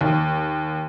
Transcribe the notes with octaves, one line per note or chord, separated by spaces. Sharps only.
D#2